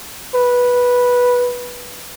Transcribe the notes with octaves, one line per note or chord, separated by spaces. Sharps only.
B4